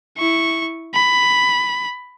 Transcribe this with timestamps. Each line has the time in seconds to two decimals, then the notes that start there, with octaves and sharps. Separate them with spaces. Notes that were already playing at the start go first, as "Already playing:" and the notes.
0.18 E4 C#6
0.94 B5